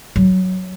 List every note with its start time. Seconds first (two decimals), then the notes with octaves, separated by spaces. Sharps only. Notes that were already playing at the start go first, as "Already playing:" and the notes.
0.16 F#3